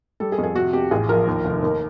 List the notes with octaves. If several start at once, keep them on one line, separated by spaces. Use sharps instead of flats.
G3 A4
G#4
F2
G#4
C3 F#4
F2 G4
A1 G#4
F3 A#4
D#2
F1
D#2